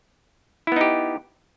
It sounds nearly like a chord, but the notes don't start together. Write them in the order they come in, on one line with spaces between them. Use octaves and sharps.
E4 B3 D#4 G4